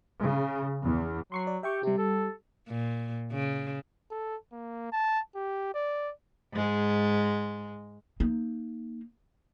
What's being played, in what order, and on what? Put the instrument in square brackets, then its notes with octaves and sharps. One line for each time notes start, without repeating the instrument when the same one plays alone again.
[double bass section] C#3
E2
[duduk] F#3 [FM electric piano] C6 C#6 C7
[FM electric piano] D5
[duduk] G4 [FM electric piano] E5 G5 C#6
[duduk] C3 [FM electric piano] G3 G4
[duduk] A4
[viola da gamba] A#2
C#3
[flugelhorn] A4
A#3
A5
G4
D5
[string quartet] G#2 G#3
[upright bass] A#3 D#4